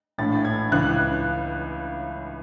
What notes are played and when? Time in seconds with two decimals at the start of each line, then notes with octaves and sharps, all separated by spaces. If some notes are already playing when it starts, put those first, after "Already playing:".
0.18 A#1 A2 E3 A6
0.45 G#6
0.72 C#2 C#3 E3 F#6